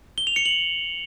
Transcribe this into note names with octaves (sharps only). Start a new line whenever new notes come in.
G7
F7
C#7
F#7